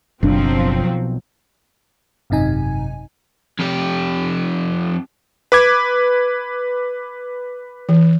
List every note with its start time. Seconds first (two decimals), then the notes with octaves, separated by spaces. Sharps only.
0.23 F#1 B1 F3 F#3 C4 D4
2.30 G#1 F#2 C3 D#4 G#5
3.59 F2 G4
5.52 B4 D6 G#6
7.89 E3